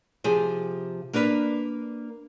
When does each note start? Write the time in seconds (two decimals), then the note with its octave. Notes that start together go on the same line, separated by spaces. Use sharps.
0.24 C3 F3 G4 G#4
1.13 A#3 D4 A#4 B4